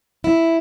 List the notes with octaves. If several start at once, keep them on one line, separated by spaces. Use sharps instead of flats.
E4